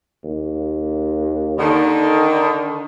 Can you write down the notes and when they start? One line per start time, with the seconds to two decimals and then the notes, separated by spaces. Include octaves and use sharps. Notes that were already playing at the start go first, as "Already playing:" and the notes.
0.24 D#2
1.58 D3 D#3